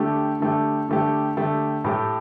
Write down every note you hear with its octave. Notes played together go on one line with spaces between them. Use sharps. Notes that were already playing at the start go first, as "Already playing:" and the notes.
Already playing: D3 A3 G4
D3 A3 G4
D3 A3 G4
D3 A3 G4
A2 A3 G4